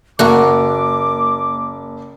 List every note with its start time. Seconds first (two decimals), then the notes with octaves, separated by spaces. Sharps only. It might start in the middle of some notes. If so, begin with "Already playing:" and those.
0.19 F#1 A#3 F#4 D6